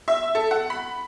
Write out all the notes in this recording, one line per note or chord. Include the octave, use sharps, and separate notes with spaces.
E5
A4
F#5
B5